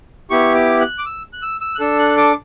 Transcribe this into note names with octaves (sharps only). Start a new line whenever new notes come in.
B3 E4 G4 C#6
D6
F#6
D6
E6
F#6
E6
E6
F#6
D4 A4 E6
F#6
D6